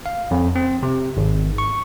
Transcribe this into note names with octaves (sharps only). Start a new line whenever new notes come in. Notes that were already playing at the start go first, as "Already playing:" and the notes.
F5
F2
C4
C3
G#1
C#6